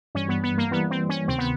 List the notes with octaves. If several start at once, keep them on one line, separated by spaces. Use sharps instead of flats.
G2 E3 G3 C#4
B3
B3
A#3
E3 G3 A#3 B3
C4
C#4
D2 C3 D#3 C4
B3